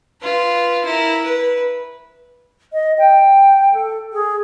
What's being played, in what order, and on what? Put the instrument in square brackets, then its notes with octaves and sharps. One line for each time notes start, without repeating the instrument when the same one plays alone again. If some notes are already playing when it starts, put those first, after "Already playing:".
[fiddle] F4 B4
E4 A#4
B4
[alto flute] D#5
G5
A4
G#4